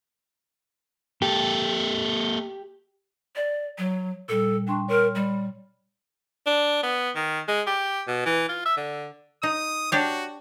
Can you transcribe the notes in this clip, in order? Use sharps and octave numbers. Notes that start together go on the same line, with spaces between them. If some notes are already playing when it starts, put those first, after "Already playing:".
A#3 G4 A4
D5
F#3
A#2 G3 A4
D4 G5 C6 C#6
A#4 C#5 C6 F6
G3
D4
B3
D#3
G#3
G4
B2
E3
F4
E5
D3
D#4 D#6
D4 F#4 G4 C#5